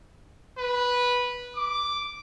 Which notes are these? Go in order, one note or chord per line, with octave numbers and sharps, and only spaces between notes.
B4
D6